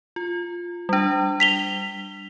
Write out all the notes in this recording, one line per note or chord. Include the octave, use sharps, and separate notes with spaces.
F4
G3 D4
B6 F7 G7